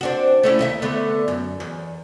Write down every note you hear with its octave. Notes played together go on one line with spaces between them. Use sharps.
C4 D4 F#4
A3 C#4 E4
D#2 D#5 E5
D3 A3 B3
F#2
E2